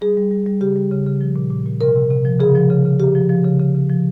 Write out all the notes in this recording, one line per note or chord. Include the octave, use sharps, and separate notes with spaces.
G3 G#4
G3
G3
G3
C#3 G4
G3
C#3
C#3
F3
A#2
A#2
A#2
C3 A#4
C3
C3
F3
C#3 G#4
F3
C#3
C#3
C#3 G4
F3
F3
C#3
C#3
C#3
F3